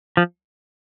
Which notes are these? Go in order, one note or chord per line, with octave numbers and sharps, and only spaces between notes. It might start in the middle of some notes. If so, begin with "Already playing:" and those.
F3